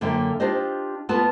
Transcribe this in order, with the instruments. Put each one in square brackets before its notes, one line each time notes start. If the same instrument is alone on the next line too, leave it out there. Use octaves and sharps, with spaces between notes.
[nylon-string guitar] F#2 D3 A#3 F4 E5 G5
D4 F4 G4 C5 D#5
A3 B3 F4 B4 A5